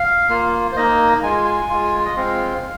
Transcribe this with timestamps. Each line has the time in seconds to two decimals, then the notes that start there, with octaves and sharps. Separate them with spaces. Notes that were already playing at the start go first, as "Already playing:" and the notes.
Already playing: F5
0.29 A#3 F4
0.72 C5
0.77 A#3 D#4 D#5
1.23 G#3 F4 G#5
1.44 G#5
1.70 G#3 F4
2.05 D#5
2.16 G#3 C4 F4 F5